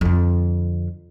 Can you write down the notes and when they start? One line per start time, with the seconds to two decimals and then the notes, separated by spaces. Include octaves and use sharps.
0.01 F2 D3